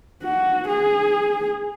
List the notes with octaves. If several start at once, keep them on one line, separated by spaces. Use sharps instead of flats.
F#4
G#4